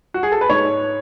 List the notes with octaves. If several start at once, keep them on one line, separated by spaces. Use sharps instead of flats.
F#4
G#4
A4
B4
G#2 C#5